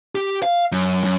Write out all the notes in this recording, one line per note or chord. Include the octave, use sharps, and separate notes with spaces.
G4
F5
F#2
F#2